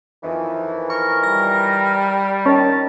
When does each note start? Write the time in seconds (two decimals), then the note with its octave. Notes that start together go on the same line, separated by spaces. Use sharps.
0.23 F2 D#3 E3
0.90 A#4 C#6
1.24 G3 A#6
2.46 D#3 C#4 A5